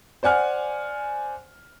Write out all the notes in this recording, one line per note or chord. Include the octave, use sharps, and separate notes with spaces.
C5 D5 F#5 G#5 F6